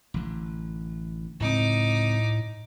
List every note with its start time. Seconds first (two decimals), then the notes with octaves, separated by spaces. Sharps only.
0.14 A1 D3
1.40 C#2 A2 C4 D#4 D6